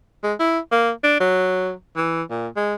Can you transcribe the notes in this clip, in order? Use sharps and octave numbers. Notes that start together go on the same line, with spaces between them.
G#3
E4
A#3
D4
F#3
E3
A#2
G#3